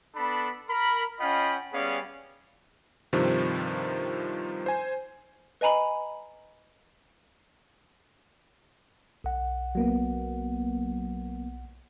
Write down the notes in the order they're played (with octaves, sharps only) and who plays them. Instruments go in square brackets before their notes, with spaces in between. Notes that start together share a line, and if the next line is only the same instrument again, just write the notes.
[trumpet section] B3 D4 A4 B5
A#4 B5
C#4 F4 D#5 F#5 G5 B5
G3 B3 C#4 G#4 D5 F5
[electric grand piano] G2 C3 D#3 F3
C5 G#5
[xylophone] B4 D#5 G#5 A#5 B5
[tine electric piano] B1 F#5
[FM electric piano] F#3 A#3 B3